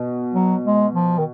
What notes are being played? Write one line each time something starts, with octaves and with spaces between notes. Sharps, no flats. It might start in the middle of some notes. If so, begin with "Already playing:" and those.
Already playing: B2
F#3
G#3
F3
D#3